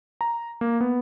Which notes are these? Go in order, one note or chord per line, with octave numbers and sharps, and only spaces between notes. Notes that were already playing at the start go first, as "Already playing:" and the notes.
A#5
A#3
B3